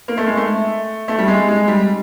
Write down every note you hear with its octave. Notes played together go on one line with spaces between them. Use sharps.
A#3
A3
G#3
A3
A3
G3
G#3
G#3
G3